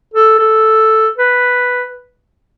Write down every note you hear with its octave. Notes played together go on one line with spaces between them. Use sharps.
A4
A4
B4